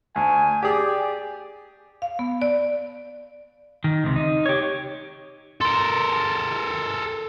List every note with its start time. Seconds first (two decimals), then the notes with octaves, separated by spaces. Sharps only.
0.16 D2 G#5
0.63 G4 G#4 D5
2.02 F5
2.19 B3
2.42 D5
3.84 D#3
4.04 C#2 C3
4.16 D#4
4.46 G4 C#5
5.61 A4 A#4 C6